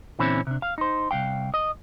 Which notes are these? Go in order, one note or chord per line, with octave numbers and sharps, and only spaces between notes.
A#2 D3 E3 C4 C#4 E4
C3 D4
F5
D#4 C5
C2 G2 F5 G5
D#5